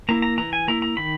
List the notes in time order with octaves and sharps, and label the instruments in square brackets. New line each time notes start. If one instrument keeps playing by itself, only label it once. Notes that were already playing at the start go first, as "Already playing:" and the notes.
[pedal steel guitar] A#3 E4 A#5
A#5
E3 A#5
G#5
A#3 E4 A#5
A#5
D#3 B5